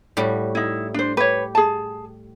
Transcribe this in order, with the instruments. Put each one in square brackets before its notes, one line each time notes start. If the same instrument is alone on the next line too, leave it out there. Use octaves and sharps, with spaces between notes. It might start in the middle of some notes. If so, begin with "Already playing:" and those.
[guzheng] A2 G3 F#4
[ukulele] D#4 E4
D4 C5
[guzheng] G4 [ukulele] B4 C#5
[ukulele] G#4 A5